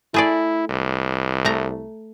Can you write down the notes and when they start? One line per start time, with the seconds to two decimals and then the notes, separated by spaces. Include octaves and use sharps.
0.14 A3 E4 G#4 D5
0.69 C2
1.45 A3 A#5